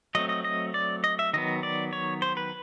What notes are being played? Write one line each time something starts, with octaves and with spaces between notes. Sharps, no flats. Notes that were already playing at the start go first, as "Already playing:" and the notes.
F#3 A3 C4 D#5
D#5
D#5
D5
D#5
E5
D#3 F#3 B3 D#5
D5
C#5
C5
B4